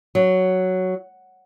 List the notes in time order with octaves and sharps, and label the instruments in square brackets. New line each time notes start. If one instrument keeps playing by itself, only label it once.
[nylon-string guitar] F#3